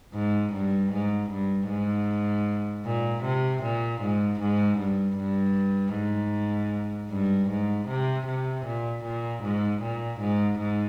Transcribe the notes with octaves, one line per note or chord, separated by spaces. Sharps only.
G#2
G2
G#2
G2
G#2
A#2
C3
A#2
G#2
G#2
G2
G2
G#2
G2
G#2
C3
C3
A#2
A#2
G#2
A#2
G#2
G#2